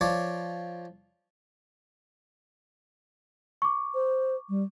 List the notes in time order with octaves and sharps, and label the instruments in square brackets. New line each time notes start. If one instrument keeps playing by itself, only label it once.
[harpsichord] F3 C#5 D5 D6
[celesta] C#6 D6
[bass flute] C5
G3